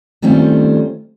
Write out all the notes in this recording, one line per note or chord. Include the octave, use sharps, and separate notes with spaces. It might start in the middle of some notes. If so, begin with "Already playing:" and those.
D#3 G3 A3 C4 C#4 F4